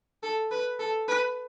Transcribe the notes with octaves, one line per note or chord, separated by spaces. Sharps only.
A4
B4
A4
B4